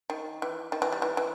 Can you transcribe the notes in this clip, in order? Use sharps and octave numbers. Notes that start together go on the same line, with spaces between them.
D#3
E3
D#3
E3
G3
E3
E3